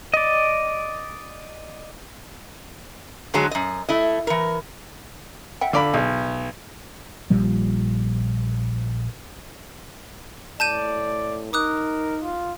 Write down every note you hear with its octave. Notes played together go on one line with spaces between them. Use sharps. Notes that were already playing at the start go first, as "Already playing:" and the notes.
D5 D#5
G#2 D3 F#3 G#3
F#2 D#5
A3 E4 D#5
E3 A#4
E5 F#5 G5
D3 D4 F4 D5 B5
B1 G#3
A#1 A#2 F3 G3
A2 D5 A5 G6 D#7
D#4 A#4 D6 D#6 F#6
F4